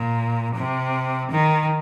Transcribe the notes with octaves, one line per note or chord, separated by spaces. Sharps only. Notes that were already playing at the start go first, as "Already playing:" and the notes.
Already playing: A#2
C3
D#3